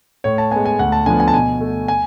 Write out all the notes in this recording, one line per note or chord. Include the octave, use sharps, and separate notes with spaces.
A2 C#5
A5
G#3 B3 G#5
G#5
D2 F#5
A5
D3 F3 B3 G#5
G#5
A5
B2 G#5
A3
G#5